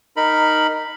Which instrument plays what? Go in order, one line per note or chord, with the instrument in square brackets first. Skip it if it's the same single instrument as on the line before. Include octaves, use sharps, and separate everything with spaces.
[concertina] D#4 A#4 B5